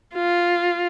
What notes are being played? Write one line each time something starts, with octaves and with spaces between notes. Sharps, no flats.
F4